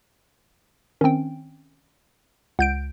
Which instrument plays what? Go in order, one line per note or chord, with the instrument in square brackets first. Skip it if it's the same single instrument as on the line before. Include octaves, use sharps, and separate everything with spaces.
[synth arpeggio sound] D#3 C4 [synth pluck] C#4 G5
[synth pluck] C#2 G6 D7 [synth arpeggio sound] F#5